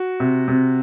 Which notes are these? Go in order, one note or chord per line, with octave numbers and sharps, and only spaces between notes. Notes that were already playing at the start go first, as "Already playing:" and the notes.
Already playing: F#4
C3
C3